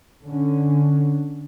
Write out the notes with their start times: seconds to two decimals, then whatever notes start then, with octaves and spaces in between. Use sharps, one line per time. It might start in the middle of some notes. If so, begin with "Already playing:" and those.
0.22 D3 C#4